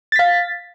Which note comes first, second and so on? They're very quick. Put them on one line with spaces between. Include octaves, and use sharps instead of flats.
A6 B6 F5